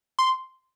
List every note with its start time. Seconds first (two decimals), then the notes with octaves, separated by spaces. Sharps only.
0.19 C6